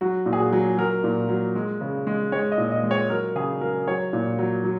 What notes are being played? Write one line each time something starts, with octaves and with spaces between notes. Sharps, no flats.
F#3 F#4
A#2
G#4
F#4
F#3
F#3 A#4
A#2
F#3
G#3
C#3
G#3
G#3 C#5
D#5
A#2
D#5
G#3
C#5
F#3 A#4
C#3 G#4
F#3 A#4
F#3 C#5
A#2
F#3
F#3